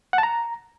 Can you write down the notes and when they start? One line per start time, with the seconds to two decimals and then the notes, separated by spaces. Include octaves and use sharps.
0.13 F#5
0.18 A5
0.23 A#5